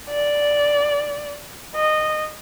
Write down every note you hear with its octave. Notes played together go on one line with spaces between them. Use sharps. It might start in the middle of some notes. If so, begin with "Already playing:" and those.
D5
D#5